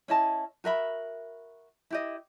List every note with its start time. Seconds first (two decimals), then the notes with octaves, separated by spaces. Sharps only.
0.08 C#4 E4 D#5 A5
0.64 F#4 A#4 E5 B5
1.90 E4 G4 D#5